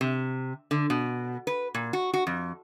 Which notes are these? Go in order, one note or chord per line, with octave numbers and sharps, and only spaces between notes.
C3
D3
B2
B4
A#2
F#4
F#4
F2